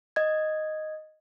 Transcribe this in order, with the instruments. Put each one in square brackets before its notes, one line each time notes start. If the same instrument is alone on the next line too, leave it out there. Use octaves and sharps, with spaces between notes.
[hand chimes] D#5 G#6